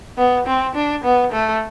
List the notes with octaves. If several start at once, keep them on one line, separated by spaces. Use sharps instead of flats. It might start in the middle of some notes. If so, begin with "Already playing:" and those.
B3
C4
D4
B3
A3